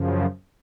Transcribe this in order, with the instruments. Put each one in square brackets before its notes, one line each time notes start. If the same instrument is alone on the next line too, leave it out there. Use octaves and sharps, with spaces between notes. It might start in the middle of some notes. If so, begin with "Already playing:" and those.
Already playing: [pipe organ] F#2 C#3 F3